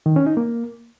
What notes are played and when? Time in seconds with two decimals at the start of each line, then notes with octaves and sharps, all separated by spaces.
0.06 D#3
0.16 C#4
0.27 D#4
0.37 A#3